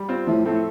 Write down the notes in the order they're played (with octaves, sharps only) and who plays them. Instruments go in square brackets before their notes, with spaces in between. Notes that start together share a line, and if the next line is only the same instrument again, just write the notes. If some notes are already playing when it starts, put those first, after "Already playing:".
Already playing: [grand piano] G3
C4 F4
[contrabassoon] A2 [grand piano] F3
[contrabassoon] A2 [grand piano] A3 C4 A4